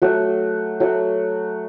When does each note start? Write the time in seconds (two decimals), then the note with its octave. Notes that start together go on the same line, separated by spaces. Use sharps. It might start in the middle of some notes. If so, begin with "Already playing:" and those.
0.02 F#3 A3 F#4
0.80 F#3 A3 F#4